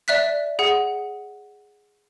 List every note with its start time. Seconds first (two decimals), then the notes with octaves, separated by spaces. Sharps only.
0.08 D5 E5 F#6 B6
0.59 G#4 F#5